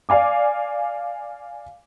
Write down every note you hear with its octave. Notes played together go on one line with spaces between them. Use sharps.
D5 F5 G#5 D6